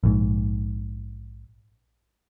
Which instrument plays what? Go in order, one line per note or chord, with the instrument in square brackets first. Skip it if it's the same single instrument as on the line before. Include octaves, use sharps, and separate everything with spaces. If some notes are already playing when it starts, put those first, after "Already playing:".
[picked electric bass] A#1 G#2